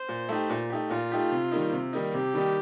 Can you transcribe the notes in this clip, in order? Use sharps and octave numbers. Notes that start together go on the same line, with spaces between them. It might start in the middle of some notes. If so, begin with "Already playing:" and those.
Already playing: C5
A#2
A3 D#4 G4
A#2
A3 D#4 G4
A#2 F4
A3 D#4 G4
C3
D#3 G3 A#3 D#4
C3
D#3 G3 A#3 D#4
C3 G4
D#3 G3 A#3 D#4